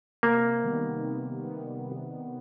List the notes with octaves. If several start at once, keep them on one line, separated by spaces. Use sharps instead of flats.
C3 A#3
D#3 G3 B3
C3
D#3 G3 B3